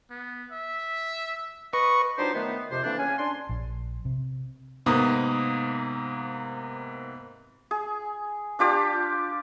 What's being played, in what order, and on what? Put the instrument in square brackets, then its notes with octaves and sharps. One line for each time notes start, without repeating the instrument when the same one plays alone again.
[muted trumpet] B3
E5
[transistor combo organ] B4 C#6 [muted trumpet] D#5
[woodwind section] F#3 D4 D#4 F4 G4 C5
D#3 A3 B3
F2 C3 C5
E3 A3 A#3 C4 D4
C#4 G#5
D4 C6
[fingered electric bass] A#1
C3
[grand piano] G#2 C3 A#3 B3 D#6
[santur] G#4
D4 F4 G4 D5